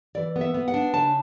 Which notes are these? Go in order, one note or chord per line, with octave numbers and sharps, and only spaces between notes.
E3 D5
B3
E5
B3
F#5
D4
C#3 A5